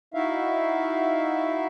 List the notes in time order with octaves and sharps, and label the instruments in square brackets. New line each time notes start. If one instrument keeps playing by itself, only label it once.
[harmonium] D#4 E4 F#4 E5 F5